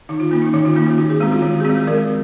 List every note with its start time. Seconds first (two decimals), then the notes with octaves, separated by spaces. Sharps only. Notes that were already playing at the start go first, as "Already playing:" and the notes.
0.09 D#3 D#4
0.20 F4
0.31 A#3 C#4 F4
0.42 D#4
0.54 D#3 D#4
0.65 F4
0.75 A#3 C#4 D#4
0.86 F4
0.98 D#3 F#4
1.10 G#4
1.20 G#3 C4 F#4
1.32 F4
1.42 D#3 F4
1.54 F#4
1.60 G#4
1.65 C4 F#4
1.70 G#3
1.77 G#4
1.87 F3 A#4